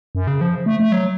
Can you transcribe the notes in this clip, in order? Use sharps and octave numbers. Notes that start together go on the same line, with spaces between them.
F#2
C#3
F3
A3
A3
F#3